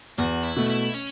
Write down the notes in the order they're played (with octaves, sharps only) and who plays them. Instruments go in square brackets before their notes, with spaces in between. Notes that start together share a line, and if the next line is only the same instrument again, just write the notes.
[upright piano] E2 [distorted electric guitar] F#4
[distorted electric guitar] E4
[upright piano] B2 A3
[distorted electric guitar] E4
C#4